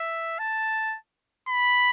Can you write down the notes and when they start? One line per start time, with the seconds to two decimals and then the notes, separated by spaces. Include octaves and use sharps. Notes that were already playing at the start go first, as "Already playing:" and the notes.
Already playing: E5
0.39 A5
1.48 B5